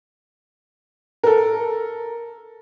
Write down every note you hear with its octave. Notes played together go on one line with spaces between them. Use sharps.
A4 A#4